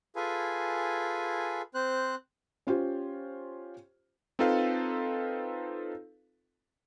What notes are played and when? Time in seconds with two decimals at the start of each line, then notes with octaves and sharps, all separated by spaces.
0.16 F4 G#4 A4 B4 G#5
1.74 C4 C5 F#6
2.67 C#4 F4 G4 C5
4.39 C4 D#4 F4 A4 B4 F5